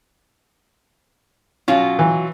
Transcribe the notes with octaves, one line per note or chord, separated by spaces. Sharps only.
B2 F#3 C#4 F4
E3